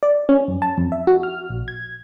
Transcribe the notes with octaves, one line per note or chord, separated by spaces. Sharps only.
D5
C#4
F#2
A5
F2
E5
F#4
F6
A#1
G#6